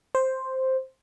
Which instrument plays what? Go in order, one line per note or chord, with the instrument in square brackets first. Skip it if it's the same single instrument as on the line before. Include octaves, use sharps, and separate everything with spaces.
[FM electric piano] C5